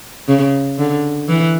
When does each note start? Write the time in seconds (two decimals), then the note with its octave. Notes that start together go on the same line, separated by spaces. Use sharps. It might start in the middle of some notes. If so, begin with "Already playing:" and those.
0.28 C#3
0.78 D3
1.29 E3